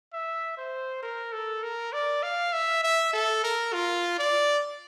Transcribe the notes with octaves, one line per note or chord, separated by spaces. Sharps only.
E5
C5
A#4
A4
A#4
D5
F5
E5
E5
A4
A#4
F4
D5